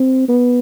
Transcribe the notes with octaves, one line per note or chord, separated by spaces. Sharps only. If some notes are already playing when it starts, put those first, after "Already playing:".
Already playing: C4
B3